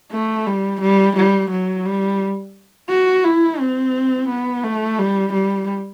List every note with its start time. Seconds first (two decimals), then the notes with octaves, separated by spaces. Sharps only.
0.12 A3
0.46 G3
0.81 G3
1.16 G3
1.51 F#3
1.86 G3
2.90 F#4
3.24 E4
3.59 C4
4.29 B3
4.64 A3
4.99 G3
5.33 G3